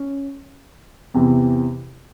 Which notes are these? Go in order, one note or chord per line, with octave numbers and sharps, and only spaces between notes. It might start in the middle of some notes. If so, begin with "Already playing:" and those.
Already playing: C#4
E2 C3 E3